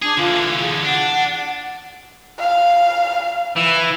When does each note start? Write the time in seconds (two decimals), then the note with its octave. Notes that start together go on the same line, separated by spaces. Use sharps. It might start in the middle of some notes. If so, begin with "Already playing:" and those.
0.02 D4 G#4
0.17 D3 E3 F4
0.61 G#4
0.85 D4 F#5
2.39 F5
3.56 E3